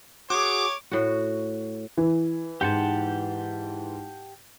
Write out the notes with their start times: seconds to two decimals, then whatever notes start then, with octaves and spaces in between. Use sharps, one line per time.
0.30 F#4 G#4 C#5 D6
0.91 A2 F#4
1.98 E3
2.61 G#2 G4 F#5 A5 C6 G6